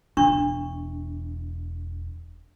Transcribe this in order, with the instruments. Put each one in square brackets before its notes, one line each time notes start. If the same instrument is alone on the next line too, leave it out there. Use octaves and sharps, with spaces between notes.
[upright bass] E1 E3 [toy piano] D4 C#6